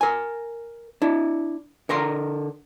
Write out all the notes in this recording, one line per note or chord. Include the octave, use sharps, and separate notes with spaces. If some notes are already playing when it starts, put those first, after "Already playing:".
A#4 G#5
D4 E4
D3 A#4 A#5 C6